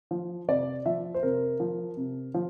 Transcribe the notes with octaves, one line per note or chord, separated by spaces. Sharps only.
F3
C3 D5
F3 E5
C5
C3 A#4
F3
C3
F3